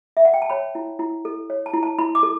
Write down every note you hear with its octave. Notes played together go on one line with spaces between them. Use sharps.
E5
F#5
G5
A5
C#5 B5
E4
E4
A4
C#5
A5
E4
A5
E4 B5
D6
A4